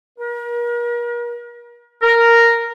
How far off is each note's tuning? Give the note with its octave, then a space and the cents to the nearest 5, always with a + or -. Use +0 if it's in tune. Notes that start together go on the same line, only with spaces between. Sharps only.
A#4 +40
A#4 -5